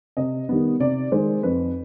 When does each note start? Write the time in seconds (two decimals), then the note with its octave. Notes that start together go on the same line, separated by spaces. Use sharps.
0.17 C3 D#5
0.49 D#3 G3 B3
0.80 C3 D5
1.12 D#3 G#3 C5
1.43 F2 B4